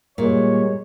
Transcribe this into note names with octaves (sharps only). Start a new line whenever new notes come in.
A#2 G3 G#3 C#5